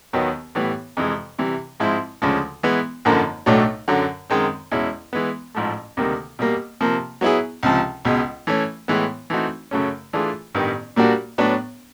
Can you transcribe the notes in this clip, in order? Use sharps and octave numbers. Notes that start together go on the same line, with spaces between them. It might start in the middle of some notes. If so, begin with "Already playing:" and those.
D#2 D#3 F#3 B3
A2 E3 G3 B3
F2 C3 E3 G#3
C3 E3 G3
G#2 F3 G#3 C4 E4
D2 C#3 F3 G#3
E3 G#3 B3
G#1 F#2 D3 F3 A#3
B1 A2 F#3 A3 D4
F#2 D3 F#3
F#2 D#3 G#3 C4
E2 B2 G#3 C#4 E4
E3 G#3 B3
A1 G#2 F3 A3
D2 C3 D#3 G3 A#3
B2 G3 A#3
C3 F3 A#3
F#3 B3 E4 G#4
C#2 C3 F3
C#2 B2 G#3
E3 A3 C#4
A2 E3 G#3 B3
E3 A3 C4 D#4 F#4
F#2 C#3 F#3 A3 C#4
E3 A3 D4 F4 G#4
A1 G2 D#3 G3 B3
A#2 G3 A#3 D4 F#4
A2 F#3 B3 D4